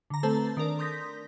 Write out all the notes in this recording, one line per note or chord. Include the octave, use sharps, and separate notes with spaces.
D3 A#5
A3 C4 A4 B4 C5 A5
D#3 D4 A#4 D5
C6 D#6 G6 A#6 B6